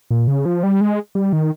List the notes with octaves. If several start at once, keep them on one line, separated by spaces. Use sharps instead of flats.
A#2
C#3
F3
G3
G#3
G3
D#3